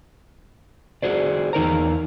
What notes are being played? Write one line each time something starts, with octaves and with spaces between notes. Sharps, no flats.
F#4 G#4 C5 D5
E2 D#4 A#4 A#5